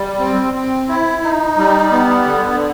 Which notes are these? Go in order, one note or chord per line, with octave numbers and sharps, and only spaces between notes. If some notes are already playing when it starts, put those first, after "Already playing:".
Already playing: G3
C4
C4
E4
D#4
G3
B3
D3